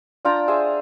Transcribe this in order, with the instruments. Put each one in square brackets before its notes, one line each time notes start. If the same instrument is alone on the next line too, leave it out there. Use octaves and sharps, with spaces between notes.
[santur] D4 F4 G5 A#5
G#4 C5 E5 G#5